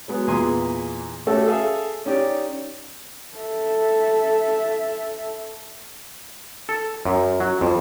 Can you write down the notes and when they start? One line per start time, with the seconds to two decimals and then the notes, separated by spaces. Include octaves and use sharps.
0.08 F#3 G#3 B3
0.27 E2 A#2 G#4 G#5 C6
1.27 A3 C#4 F#4 G4 A4
1.48 G#4 A4 E5 F5
2.06 C#4 D#4 G4 D5
3.37 A4 E5
6.69 A4
7.05 F#2
7.40 F#3
7.61 F2